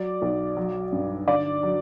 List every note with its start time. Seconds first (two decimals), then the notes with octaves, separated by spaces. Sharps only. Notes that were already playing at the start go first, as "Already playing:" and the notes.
Already playing: F#3 D5
0.22 B1
0.57 F#3
0.92 G2
1.28 D3 D5
1.63 F#3